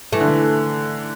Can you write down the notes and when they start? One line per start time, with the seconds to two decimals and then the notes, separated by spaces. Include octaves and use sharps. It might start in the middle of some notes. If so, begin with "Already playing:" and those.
0.13 E3 A3
0.21 D3
0.28 E3